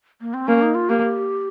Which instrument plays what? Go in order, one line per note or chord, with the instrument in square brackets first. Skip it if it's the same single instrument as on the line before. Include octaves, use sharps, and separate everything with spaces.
[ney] A#3
C4
[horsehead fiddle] A#3 [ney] C#4
[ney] D#4
F4
[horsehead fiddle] A#3 [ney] G4